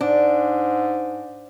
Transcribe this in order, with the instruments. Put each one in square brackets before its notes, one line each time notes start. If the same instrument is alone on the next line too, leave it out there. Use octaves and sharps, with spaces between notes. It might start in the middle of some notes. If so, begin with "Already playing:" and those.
[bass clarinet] G#2 [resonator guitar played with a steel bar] D4